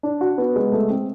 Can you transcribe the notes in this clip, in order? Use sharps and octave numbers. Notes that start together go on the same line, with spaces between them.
D4
F#4
B3
G#3
A3
C4